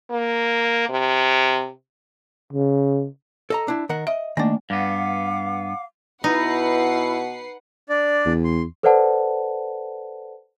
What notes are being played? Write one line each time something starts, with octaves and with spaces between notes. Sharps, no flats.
A#3
C3
C#3
A4 D#5 A#5
D4 E4
D#3 A#4 F#5
D#5 E5
D#3 A3 A#3 D4
G2 B3 F5 F#5 D6
B2 D#4 E4 B4 F#5 C7
D4 D5
E2
C6
A4 B4 C5 D5 F#5 A5